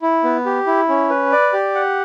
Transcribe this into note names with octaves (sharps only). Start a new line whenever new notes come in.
E4
B3
G4
E4
C#4
B4
D5
G4
F#5